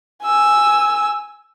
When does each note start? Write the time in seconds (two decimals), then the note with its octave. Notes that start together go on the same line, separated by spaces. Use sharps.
0.24 G#5 E6